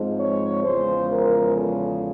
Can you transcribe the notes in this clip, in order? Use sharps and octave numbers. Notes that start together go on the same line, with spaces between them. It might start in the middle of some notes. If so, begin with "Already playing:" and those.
Already playing: G#2 F3 G#3 C4
C#5
E2 C#3 F3 G#3 C5
A#4
A4